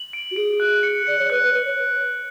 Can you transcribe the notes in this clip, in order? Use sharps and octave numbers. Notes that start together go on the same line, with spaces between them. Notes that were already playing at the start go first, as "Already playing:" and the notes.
Already playing: F#7
D7
F#4
G#4 D7
F#6
C#7
D5 C#7
C#5
B4 F#6
B4
B4 C#7
C#5